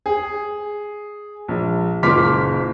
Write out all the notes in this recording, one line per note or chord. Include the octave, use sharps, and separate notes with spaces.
G#4
A#1
F#1 A#2 C6 D6 F6 B6